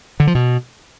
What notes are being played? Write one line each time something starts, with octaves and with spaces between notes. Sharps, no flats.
D3
F3
B2